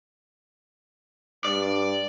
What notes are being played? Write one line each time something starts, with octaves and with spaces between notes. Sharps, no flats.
G2 D5